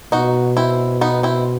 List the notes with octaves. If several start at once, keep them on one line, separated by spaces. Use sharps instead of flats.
B2 D#4 F#4
C4 E4
B3 D#4
C4 E4